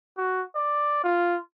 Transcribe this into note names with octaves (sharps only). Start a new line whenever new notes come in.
F#4
D5
F4